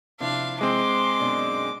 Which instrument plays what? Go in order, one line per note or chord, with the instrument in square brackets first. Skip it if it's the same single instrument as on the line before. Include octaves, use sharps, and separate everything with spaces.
[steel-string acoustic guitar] C3 F3 E4 [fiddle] D4 F5
[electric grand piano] G#3 C4 [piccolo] C6 [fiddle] D6
[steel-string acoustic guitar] F#2 B2 D4